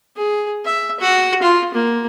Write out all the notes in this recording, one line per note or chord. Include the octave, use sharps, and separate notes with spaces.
G#4
E5
F#4
F4
A#3